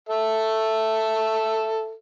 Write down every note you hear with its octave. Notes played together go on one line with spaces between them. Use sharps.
A4 E5